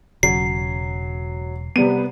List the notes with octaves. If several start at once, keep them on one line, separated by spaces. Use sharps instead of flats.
E1 C#3 F#3 C7
C3 G3 B3 D#7